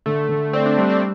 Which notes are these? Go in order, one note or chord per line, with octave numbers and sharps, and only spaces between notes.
D3 A3
D3
C4 D5
D4
G3 A3
C4